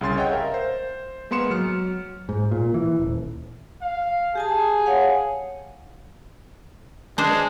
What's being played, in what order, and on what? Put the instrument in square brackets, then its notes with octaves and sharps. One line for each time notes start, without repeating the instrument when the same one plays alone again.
[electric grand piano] C2 C#3 C6 A6
C#5 D#5 F#5 G5
A#4 E5 F5
C5
G#3 A#3 B3 C6 C#7 E7
F#3 F6 C#7
[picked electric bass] G#2
A#2
E3
D#1
[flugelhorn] F5
[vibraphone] G4 G#5 A5 [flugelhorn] G#4
[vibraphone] C#5 F5 F#5
[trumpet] G#3 [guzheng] D4 C5